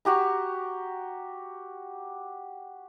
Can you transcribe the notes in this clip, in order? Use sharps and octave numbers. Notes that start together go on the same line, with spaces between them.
F#4 G4 A#5